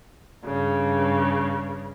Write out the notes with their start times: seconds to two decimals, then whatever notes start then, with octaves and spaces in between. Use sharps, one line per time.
0.44 G2 C#3